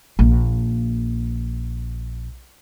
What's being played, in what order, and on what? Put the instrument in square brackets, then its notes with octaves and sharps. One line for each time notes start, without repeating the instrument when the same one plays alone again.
[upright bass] A#1 A#3